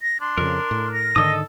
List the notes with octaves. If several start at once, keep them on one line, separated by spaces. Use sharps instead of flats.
A#6
D4 C6
F2 C#3 A#4
A2
A#6
G#2 D3 D#3 A4 D#5 D#6